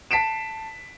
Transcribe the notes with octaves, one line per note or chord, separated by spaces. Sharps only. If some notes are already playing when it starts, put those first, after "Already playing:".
A5 B6 C7 D7 E7